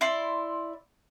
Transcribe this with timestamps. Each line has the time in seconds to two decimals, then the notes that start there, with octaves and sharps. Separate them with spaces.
0.01 E4 D5 C6